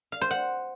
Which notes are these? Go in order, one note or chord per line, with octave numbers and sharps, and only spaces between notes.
F5
C5
F#5